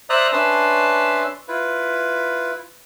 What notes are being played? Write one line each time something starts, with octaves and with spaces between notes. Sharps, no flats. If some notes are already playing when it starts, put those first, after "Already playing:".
C5 D5 E5 A#5 D#6 F#6
C#4 D4 B4 E5 A5 C6
E4 F4 B4